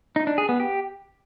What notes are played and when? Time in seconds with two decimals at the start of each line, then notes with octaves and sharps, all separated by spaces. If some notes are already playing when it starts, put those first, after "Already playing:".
0.16 D#4
0.27 D4
0.38 G#4
0.49 B3
0.60 G4